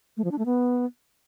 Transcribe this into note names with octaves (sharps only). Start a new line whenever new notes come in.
A3
F3
D4
A3
B3